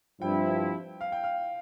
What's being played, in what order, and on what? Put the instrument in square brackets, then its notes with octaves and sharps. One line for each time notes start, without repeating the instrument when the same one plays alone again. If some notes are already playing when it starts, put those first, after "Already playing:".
[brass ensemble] G2 F3 C4 E4 [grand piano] G5
[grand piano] F5
G5
F5